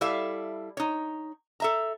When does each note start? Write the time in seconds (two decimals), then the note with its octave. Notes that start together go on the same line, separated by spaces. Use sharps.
0.01 G3 E4 A4 E5 F5
0.77 D#4 C#5
1.60 A4 E5 A#5